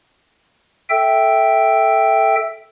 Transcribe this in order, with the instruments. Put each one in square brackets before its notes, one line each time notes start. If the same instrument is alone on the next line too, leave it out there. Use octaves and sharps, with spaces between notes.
[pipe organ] A4 E5 G5